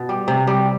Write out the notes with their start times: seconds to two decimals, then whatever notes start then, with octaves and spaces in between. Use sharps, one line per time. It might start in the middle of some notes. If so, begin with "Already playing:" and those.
Already playing: B2
0.09 G3
0.28 C3
0.47 G3